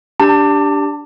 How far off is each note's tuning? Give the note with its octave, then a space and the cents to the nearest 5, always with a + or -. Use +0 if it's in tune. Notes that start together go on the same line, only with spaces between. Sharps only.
D4 -10 G4 +0 A5 +30